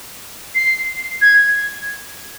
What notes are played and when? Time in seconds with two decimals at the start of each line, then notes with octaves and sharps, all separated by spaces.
0.55 C7
1.22 G#6